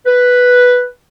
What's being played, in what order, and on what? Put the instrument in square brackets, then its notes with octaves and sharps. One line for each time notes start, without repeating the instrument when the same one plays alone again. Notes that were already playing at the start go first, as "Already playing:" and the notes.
[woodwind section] B4